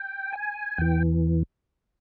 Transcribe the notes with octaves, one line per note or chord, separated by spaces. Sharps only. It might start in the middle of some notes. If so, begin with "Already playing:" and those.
Already playing: G5
G#5
E2 E3 G5